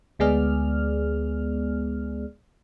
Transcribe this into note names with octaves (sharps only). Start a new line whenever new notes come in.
D2 G#3 B3 G#4 D5 F6